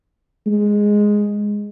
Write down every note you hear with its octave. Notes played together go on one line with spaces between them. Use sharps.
G#3